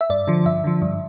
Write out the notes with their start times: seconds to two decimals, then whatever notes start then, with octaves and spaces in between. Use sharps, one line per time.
0.01 E5
0.10 G2 D5
0.27 D3 F3
0.46 G2 E5
0.64 D3 F3
0.82 G2